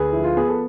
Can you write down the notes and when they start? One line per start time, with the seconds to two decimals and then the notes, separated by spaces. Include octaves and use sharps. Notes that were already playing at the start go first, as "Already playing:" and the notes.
Already playing: D2 G#4 B4
0.12 F3 E4
0.24 F4
0.37 B3 G#4
0.48 A4